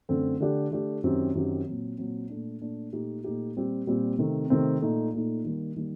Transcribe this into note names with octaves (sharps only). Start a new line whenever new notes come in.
F#2 D3 A3 C4
D3 A3 D4 G4
D3 A3 D4 G4
F#2 D#3 F#3 C4 G4
F#2 D#3 F#3 C4 G4
A#2 F#3 C4
A#2 F#3 C4
A#2 A3 D4
A#2 A3 D4
A#2 A3 D#4 G4
A#2 A3 D#4 G4
A#2 G3 C4 G4
A#2 G3 C4 G4
C3 D#3 A3 C4
C3 D#3 A3 C4
A#2 A3 D#4
A#2 A3 D#4
D#3 G3 A#3
D#3 G3 A#3